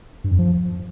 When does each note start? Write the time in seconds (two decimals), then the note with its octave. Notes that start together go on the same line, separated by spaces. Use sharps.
0.24 G2
0.31 F2
0.39 F3